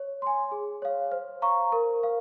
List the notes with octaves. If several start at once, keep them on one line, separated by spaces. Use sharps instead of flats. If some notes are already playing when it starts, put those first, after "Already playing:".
Already playing: C#5
G#5 C6
G#4
C#5 F5
C5
F5 A#5 C#6
A#4
F5